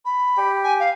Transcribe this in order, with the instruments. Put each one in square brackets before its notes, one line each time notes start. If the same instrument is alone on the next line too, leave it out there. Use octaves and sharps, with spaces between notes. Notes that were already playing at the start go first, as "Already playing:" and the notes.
[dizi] B5
[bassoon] G4
[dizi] G#5
F5